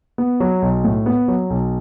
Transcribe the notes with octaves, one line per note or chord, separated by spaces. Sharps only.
B3
F#3
B1
A2
B3
F#3
B1